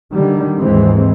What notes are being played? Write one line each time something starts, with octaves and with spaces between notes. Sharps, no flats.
D3 D#3 G3
D#2 G#2 E3 G#3 C4